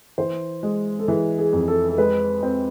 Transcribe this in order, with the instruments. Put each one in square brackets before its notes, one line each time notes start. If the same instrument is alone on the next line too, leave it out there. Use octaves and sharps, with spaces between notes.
[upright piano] E3 [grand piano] C5
[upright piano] G#3
[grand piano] A4
[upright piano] E3 [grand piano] G#4
[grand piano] G#4
[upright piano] F2
[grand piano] A4
A4
[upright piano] G#3 [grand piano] B4
[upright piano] C4